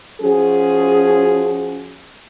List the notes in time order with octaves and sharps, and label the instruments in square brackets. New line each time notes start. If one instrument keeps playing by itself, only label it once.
[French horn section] F3 C#4 F#4 G#4